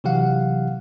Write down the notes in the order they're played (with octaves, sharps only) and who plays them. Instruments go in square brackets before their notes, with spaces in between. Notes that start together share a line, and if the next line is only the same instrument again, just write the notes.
[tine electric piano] C3 E3 F#3 G4 F5 F#5